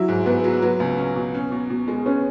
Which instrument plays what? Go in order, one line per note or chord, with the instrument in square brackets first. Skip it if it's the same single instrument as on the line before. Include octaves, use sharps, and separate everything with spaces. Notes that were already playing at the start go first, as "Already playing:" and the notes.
Already playing: [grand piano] F#3 [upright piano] E4
[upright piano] G#2
[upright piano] G#2 [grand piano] B3
[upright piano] F#3
[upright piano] F#3 [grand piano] B3
[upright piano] C#2
C#4
B2
C#4
B2
B2
G#3
[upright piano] B3 [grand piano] C#4